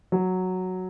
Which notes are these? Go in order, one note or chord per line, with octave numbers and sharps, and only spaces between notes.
F#3